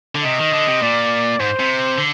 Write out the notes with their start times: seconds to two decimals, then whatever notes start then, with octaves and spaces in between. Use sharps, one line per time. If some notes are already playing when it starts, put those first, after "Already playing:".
0.15 D3
0.24 C3 D#5
0.39 D#3
0.53 D3
0.68 C3
0.82 A#2 D5
1.40 G#2 C5
1.59 C3
1.98 D3